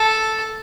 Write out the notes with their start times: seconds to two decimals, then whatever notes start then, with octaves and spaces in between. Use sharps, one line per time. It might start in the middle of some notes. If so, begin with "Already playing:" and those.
Already playing: A4